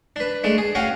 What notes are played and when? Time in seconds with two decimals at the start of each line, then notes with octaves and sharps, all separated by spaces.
0.16 D4 B4
0.44 G#3 A3 D4
0.58 G#4
0.75 C#4 F#4 F5 G5 G#5